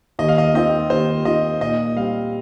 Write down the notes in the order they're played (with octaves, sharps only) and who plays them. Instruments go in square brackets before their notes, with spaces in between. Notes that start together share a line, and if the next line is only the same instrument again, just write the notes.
[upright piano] D#2 [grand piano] D#5
[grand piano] F5
D#5
[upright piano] D#3 C4 F4 [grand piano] D#5
[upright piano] D#2 [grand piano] C5
[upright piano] D#3 C4 F4 [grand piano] D#5
[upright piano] A#2 [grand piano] D#5
[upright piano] G3 C4 [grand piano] F5